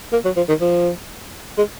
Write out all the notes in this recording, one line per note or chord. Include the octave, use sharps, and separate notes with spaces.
A#3
F#3
F3
D#3
F3
G#3